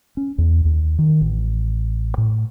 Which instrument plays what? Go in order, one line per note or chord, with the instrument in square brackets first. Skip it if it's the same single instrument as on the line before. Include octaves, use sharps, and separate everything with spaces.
[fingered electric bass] C#4
E2
D#2
D#3
A1
A2